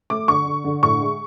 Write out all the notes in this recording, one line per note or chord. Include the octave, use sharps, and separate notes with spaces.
A3 D6
D3 C#6
D3
D3
A2 C#6
G#3